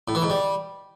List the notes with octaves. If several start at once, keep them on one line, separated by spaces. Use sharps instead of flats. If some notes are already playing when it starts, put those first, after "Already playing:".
A2
E3
G#2
G3